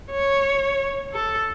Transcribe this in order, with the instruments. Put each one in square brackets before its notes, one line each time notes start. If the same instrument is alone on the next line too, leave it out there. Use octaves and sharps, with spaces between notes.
[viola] C#5
A4